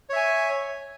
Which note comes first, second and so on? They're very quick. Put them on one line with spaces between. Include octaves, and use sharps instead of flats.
C#5 E5 G#5